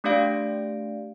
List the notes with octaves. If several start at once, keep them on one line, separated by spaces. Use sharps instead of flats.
A3 D4 G4 D5 F5 D7